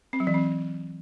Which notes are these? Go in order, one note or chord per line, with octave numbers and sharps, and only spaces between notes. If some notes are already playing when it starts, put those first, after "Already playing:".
C4
F#3
E3
C4